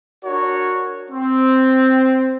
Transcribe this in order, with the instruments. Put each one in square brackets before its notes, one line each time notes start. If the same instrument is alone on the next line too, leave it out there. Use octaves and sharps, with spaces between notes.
[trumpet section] D4 F#4 A#4 C#5
C4